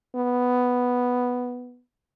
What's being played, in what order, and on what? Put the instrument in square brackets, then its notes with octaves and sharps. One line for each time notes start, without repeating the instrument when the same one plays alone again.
[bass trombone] B3